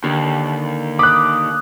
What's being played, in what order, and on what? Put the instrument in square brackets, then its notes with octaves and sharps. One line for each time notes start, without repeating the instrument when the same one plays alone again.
[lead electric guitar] D#2 [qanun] D3
[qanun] B5 [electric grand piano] D6 F#6 [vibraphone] D#6